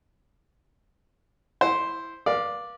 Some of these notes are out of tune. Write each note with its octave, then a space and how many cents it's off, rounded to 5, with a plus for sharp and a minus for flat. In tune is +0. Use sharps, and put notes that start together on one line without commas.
E4 +0 C5 +0
B4 -45 D5 +0 F5 +0